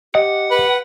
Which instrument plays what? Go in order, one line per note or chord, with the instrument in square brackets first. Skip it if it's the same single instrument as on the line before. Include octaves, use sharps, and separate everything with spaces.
[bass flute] G4 [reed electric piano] D#5 [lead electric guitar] F#5
[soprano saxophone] B4